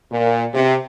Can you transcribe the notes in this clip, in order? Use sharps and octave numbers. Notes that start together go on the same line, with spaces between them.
A#2
C3